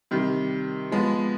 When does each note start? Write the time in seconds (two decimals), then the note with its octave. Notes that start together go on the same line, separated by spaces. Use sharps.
0.11 C3 D#3 G3
0.92 F3 G#3 B3